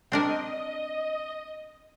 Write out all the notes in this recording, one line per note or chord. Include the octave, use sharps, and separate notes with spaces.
C4 D4 A#4 D#5